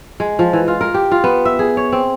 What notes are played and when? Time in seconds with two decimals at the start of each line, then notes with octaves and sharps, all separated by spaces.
0.20 G#3
0.39 F3
0.53 E3
0.68 F4
0.81 A#4
0.94 G4
1.12 F4
1.24 B3
1.45 E5
1.59 G#4
1.77 C#5
1.92 C4